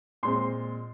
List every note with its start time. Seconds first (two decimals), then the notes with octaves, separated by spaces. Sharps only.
0.23 A#2 G#3 C4 C6